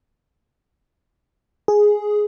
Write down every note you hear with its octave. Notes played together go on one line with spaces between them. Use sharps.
G#4